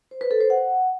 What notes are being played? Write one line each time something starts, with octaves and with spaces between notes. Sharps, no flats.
C5
B4
A4
C5
F#5